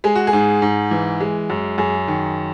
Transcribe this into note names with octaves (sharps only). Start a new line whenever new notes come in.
G#3 G#4
F#4
G#4
G#2
G#2
E3
G#3
F#2
F#2 G#4
D#3